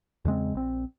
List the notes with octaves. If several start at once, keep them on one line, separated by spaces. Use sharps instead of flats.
E2 C#3 G#3 C4
A#1 C4